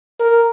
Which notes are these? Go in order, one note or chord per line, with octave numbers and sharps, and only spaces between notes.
A#4